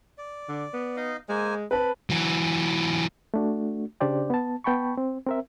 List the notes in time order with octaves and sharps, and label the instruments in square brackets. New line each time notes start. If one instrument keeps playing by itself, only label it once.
[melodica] D5
[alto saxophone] D3
B3
[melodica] D#4 D#5 F5
[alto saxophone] G#3 [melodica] A#3 C5 G#5
[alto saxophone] C4 [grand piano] B4 A5 [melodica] B5
[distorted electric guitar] E3 F#3
[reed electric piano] A3 D4 F#4
C#3 D4 G4 C5 D5 G5
B3 A5
B3 G5 A5 B5 C#6
C4
C4 A#4 E5